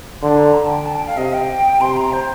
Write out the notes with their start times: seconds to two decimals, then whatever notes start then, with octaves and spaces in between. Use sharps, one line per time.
0.22 D3 C6
0.38 A#5
0.54 A5
0.70 G5
0.85 A5
0.96 G5
1.07 F5
1.17 C3 D#5
1.33 G5
1.80 C3 C6
1.97 A#5
2.12 C5